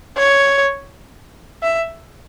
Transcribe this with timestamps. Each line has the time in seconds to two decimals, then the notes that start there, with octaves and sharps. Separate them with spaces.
0.17 C#5
1.63 E5